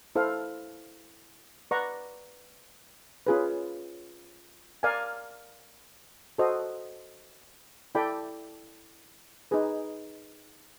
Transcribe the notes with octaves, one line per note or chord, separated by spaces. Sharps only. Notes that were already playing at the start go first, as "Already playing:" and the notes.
E4 A4 C5 F5
B4 D5 F#5 A#5 C#6
C#4 F4 G#4 B4
A#4 D5 F5 G#5
F#4 A4 C5 D#5
E4 A4 D5 G5 B5
D#4 G#4 B4